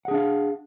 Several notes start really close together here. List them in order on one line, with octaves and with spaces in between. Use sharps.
F#5 G#4 D4 F5